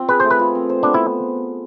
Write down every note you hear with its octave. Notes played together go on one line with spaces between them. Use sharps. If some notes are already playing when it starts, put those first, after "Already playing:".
Already playing: C4 F4
G#4 B4
A3 C5
B4
F4
C4
C5
B3 D4
E4